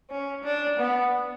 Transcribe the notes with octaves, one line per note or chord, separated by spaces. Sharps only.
C#4
D4
B3